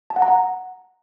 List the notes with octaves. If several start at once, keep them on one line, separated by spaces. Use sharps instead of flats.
A5
F#5
A#5
F#5